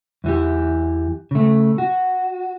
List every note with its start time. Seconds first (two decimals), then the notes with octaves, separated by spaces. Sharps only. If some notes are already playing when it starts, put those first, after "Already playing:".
0.24 E2 E3 G4
1.31 C#3 A3
1.78 F#4